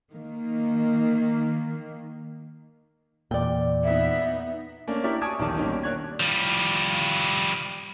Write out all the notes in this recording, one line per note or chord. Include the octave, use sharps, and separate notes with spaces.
D#3 A#3
E2 A#2 D5 G5
B3 D#4 E5
A3 A#3 C#4 D4
E4 G4 A#4 C#5 D5 E5
G#5 A5 C#6 D#6 G#6 D7
B1 E2 D#3 G4 D5 A5
B2 D#3 G3 A#3 C#4 D#4
A#3 D4 C#5 F#6 G#6
F3 G3